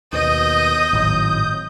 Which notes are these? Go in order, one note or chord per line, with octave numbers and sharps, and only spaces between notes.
D#2 B2 D#5 D#6 G6
G#1 A2 F#3